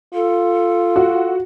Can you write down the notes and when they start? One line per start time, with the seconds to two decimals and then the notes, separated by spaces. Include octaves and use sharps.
0.14 F4 A4
0.96 F#4